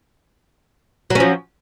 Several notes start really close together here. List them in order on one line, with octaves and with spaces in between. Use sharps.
F#3 C#4 F3